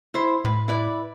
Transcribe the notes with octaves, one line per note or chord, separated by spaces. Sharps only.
E4 C5
A2 B4
E4 B4 D5